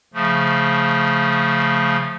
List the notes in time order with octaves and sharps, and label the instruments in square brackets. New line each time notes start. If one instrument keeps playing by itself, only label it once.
[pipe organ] C#3 F3 A3